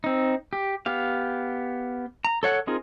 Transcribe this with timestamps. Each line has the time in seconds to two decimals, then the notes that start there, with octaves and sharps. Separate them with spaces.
0.04 C4 D#4
0.53 G4
0.86 B3 G4 F5
2.25 A#5
2.43 A4 C#5 F#5
2.67 C4 D#4 F4 G#4 A#4